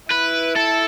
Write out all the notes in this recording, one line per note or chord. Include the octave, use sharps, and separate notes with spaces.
E4 B4
A4